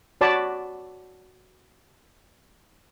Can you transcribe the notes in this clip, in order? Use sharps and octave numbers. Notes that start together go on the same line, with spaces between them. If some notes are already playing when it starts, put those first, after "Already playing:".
F#4 C#5 D5 A5 B5